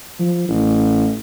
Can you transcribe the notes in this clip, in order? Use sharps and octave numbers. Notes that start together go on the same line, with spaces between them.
F3
A1